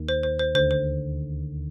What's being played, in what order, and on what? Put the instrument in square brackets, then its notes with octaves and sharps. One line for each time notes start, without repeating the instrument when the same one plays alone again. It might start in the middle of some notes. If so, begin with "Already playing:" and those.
Already playing: [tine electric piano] D#2 D#3
[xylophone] C5
C5
C5
[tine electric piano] D2 D3 [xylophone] C5
[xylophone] C5